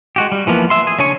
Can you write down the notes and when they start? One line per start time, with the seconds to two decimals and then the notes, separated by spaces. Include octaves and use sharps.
0.16 G#3 F#4 G4
0.32 G3
0.47 E3 F3 A#3 B3
0.70 E5 C6
0.87 G#4
0.99 C#3 D4 C#5 G#5 C#6